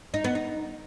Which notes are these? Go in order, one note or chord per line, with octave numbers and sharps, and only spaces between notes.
D#4
B3
D#4